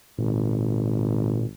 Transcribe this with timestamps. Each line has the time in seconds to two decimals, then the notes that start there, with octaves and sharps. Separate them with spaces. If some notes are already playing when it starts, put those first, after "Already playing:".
0.18 G#1 A#2